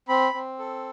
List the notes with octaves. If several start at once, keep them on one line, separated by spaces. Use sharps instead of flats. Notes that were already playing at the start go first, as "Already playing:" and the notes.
C4 B5
C4
A4